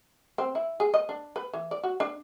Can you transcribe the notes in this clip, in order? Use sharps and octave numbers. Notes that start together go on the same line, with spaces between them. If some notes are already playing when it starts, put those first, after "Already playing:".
C4
E4
G#4
D#5
D4
B4
E3
D5
F#4
D4